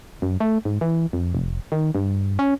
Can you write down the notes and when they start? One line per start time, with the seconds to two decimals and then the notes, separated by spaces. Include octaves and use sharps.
0.22 F#2
0.40 A3
0.65 G#2
0.81 E3
1.13 F2
1.35 F1
1.72 D#3
1.95 G2
2.39 C#4